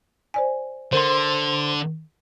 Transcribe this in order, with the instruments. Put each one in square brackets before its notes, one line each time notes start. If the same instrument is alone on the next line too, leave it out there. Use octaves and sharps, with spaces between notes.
[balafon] C5 D5 G#5
[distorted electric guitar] D3 [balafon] A#4 [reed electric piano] C5 C6